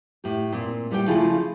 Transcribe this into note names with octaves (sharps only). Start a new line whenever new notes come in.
A2 G4
A#2 C4
A2 G3 G4 B4 G5
C#3 F3 A3 E4 F4 G#4